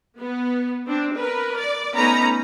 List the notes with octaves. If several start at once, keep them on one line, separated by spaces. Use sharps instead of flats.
B3
C4 D4
A#4 B4
D5
A3 B3 C#4 D#4 A#5 B5